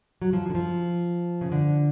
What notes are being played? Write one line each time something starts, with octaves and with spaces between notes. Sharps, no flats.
F#3
F3
D3
F3
C#3
D3